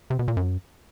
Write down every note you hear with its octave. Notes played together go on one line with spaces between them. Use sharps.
C3
B2
A#2
F#2